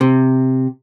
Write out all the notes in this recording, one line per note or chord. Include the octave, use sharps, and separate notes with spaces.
C3